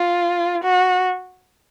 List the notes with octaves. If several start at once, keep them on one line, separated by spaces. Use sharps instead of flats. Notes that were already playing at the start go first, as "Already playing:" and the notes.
Already playing: F4
F#4